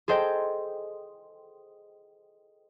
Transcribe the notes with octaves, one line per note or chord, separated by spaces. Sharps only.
G#4 A4 C5 D#5 G5